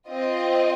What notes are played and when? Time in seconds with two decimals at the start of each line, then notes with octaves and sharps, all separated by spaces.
0.08 C4 F4 D#5